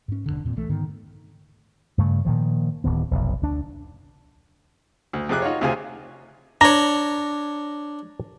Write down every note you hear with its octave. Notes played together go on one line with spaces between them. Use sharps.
G#2 C#4
E1 D#2 D3
E2 A#2 C4
B1 E3 A3
G#2 D3 D#3 B3
G2 C#3 A3
A#2 D#3 F3
D1 D#3 B3
F1 B1
D2 D4
D2
F2 C3 G#4 D6 F#6
D#4 F4 F#4 C#5
D2 C3 F4 G#4 G#5
D4 C#5 A#5